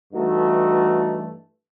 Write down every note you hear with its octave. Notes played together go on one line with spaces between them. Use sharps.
G2 E3 A3 D#4 F#4